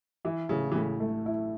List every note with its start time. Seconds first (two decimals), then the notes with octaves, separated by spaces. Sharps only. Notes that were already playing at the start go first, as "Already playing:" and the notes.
0.25 E3 E4
0.49 A1 C#3
0.72 E3
0.75 A2 C#3
1.00 A3
1.26 E4